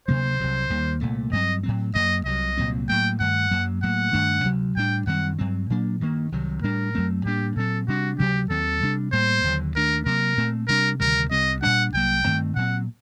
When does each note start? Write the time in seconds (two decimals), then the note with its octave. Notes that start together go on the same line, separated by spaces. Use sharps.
0.08 D2 C3 F#3 A#3 C5
0.40 C2 C3 F#3
0.70 D#2 D#3 G3 A#3
1.01 C2 A#2 A3
1.32 G2 F#3 C4 D#5
1.63 A2 F#3 C4
1.95 F#2 F#3 A#3 D#5
2.26 C2 C3 F#3 D#5
2.57 C2 A#2 F#3 C4
2.89 A2 F#3 A#3 G5
3.20 G2 D#3 A3 F#5
3.51 F#2 F#3 A#3
3.83 A2 F#3 A#3 F#5
4.13 G2 D#3 A3 D4
4.44 D2 C3 F#3
4.76 A2 G3 D4 G5
5.06 F#2 D#3 G3 C4 F#5
5.38 G2 F#3 C4
5.70 A#2 F#3 A#3 D4
6.01 G2 D#3 G3 A#3
6.32 C2 C3 D#3 F#3
6.63 A2 G3 D4 A#4
6.95 F#2 F#3 A3 C4
7.25 A2 G3 A#3 D4 G4
7.56 A#2 F#3 C4 A4
7.88 C3 G3 D4 F#4
8.19 D2 C3 F#3 G4
8.50 D#2 D#3 F#3 C4 A4
8.82 C3 G3 D4
9.12 A2 G3 A#3 C5
9.44 D#2 D3 F#3
9.75 D#2 D#3 A3 D4 A#4
10.06 C3 F#3 A#3 A#4
10.37 A#2 A3 C4
10.68 C3 G3 D4 A#4
11.00 D2 C3 D#3 G3 A#4
11.31 C2 C3 G3 C4 D#5
11.62 A#2 G3 D4 F#5
11.93 C2 C3 F#3 A#3 G5
12.24 G2 D#3 A3 C4
12.55 A#2 F#3 C4 F#5